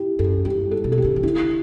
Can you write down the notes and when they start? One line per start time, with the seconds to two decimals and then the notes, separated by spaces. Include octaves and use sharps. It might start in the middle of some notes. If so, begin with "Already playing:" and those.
Already playing: E4 G4
0.19 F#2 A4
0.45 G2 G4
0.71 A4
0.84 B2
0.92 A4
0.98 G4
1.04 C#3
1.16 E3
1.23 D3 E4